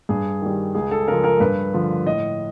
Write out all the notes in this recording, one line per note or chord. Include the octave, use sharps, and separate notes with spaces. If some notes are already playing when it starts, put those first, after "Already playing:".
G2 G#4
D#3 G3
C#2 G#4
A4
C#3 F3 A#4
A#4
G2 B4
D3 F3
A2 D#5